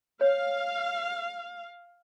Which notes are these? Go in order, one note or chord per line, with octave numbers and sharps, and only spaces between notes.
C#5 F5